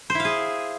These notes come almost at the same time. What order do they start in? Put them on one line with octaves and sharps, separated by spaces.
C5 E4 F5 G#4